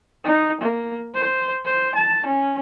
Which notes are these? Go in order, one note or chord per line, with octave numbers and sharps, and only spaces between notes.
D#4
A#3
C5
C5
A5
C#4